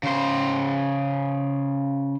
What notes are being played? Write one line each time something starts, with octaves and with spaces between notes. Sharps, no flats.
C#3 C5